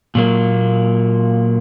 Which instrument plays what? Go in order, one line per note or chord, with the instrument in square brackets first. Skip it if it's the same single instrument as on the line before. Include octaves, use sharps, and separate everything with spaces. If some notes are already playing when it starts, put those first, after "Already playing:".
[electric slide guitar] A#2 F#3 A#3